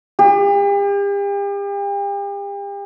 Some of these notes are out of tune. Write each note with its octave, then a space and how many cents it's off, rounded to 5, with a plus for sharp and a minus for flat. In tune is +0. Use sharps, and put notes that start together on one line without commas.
G4 +40